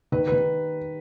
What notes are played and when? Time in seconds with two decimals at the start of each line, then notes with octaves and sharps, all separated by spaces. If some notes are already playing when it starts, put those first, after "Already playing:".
0.12 D#3 B4
0.28 B4
0.32 D#3